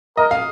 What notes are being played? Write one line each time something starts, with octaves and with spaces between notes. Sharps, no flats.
A#4 D#5
F5